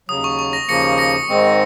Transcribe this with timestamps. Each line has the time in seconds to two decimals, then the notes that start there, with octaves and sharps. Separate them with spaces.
0.09 D#2 C#3 F#3 D#6
0.24 C#6
0.39 C#6
0.53 A#6
0.68 D#2 C#3 F3 A#3 A#6 C#7
0.98 A#6 C#7
1.29 G#2 D#3 G#3 C4